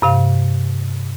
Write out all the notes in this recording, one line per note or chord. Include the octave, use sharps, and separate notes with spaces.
G2 C3 F5